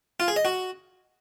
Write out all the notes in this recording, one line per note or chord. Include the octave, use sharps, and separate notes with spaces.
F4
G#4
D#5
F#4